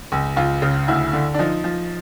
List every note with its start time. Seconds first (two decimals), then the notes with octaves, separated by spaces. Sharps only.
0.12 C#2
0.37 C#2 F4
0.62 C#3
0.88 D2 E4
1.13 D3
1.34 D4
1.39 F3 D#4
1.64 F3